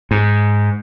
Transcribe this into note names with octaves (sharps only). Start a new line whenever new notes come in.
G#2